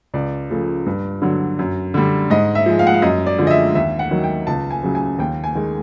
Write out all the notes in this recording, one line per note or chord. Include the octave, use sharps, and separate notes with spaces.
C#2 D5
C#3 F3 A3
G2
D3 F#3
F#2
D3 G3
G#2 D#5
E5
F3 G#3
F5
F#5
F5
F#2 D#5
D5
D3 F3 G#3
D#5
E5
D#2 E5
F#5
D#3 F#3
G5
C#2 A5
G#5
C#3 F#3
G#5
D#2 G5
G#5
D#3 G#3